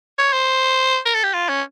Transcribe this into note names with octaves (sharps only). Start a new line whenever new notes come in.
C#5
C5
A#4
A4
G4
F4
C#4